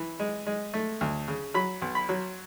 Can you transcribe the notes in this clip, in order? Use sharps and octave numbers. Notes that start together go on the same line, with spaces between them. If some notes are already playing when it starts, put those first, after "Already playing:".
Already playing: E3
G#3
G#3
A3
D2
C#3
F#3 B5
B1
B5
F#3